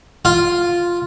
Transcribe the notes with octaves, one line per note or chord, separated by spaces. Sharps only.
F4